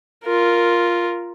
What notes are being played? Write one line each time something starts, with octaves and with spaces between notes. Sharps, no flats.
F4 A#4